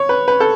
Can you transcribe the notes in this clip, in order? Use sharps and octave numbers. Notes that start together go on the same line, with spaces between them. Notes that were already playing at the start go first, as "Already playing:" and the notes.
Already playing: C#5
B4
B4
A4